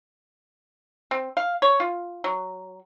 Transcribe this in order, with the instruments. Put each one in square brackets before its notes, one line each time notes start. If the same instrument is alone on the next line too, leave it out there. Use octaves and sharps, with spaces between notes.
[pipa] C4
F5
C#5
F4
F#3